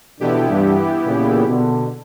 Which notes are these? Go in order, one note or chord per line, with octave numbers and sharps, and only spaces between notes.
B2 D3 E3 B3 E4 G4
G2
A#2 C#3
B2 D3